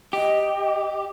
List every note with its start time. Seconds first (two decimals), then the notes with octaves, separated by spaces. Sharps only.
0.13 G4 D#5